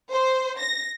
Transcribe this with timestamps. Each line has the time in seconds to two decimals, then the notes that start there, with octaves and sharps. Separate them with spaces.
0.12 C5
0.59 A#6